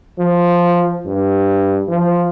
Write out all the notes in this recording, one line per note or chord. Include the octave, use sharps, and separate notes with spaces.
F3
G2
F3